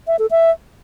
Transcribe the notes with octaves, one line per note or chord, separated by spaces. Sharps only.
E5
A4
E5